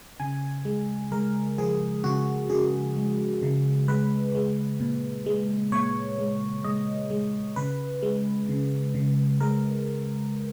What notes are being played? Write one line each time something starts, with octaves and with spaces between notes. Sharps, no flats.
C#3 G#5
G#3
G#3 A#4
F3 G#4
C#3 F#4
C#3 G#4
G#3
C#3
G#3 B4
G#3
A#2
G#3
A#2 C#5
G#3
G#3 D#5
G#3
C#3 B4
G#3
C#3
C#3
G#3 A#4